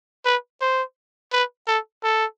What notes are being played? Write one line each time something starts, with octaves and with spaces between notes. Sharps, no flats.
B4
C5
B4
A4
A4